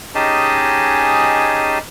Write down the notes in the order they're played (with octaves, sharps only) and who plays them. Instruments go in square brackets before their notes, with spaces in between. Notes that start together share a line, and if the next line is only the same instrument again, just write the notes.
[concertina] C#4 D#4 G4 G#4 D#5 A5